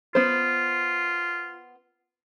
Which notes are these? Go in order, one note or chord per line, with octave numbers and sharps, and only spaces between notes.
B3 F4 C5